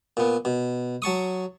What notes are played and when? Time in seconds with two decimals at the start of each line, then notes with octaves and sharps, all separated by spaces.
0.17 A#2 B3
0.45 B2
1.02 F#3 A5 C#6 D#6